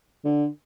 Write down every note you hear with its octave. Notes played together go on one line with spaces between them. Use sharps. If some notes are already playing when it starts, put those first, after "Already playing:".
D3